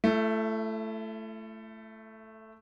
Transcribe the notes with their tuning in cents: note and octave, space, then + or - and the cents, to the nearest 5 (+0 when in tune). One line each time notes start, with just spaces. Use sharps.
A3 +0 E4 +40